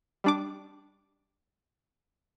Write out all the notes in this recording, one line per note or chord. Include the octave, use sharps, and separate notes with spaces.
G3 D4 D6